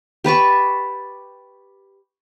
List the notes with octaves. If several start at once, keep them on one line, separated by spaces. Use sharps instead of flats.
G4 B4 A5 C#6